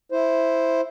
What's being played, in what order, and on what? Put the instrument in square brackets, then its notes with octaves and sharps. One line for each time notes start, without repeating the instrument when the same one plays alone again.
[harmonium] E4 C5